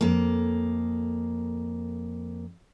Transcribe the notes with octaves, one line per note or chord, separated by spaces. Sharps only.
F2 A#3